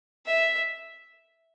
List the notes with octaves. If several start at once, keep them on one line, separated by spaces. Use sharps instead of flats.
E5